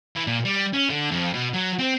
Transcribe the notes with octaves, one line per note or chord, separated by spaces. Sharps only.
E3
A#2
G3
C#4
D3
F2
B2
F#3
C4